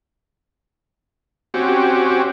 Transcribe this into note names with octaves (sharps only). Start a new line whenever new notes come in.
C4 C#4 F#4 G4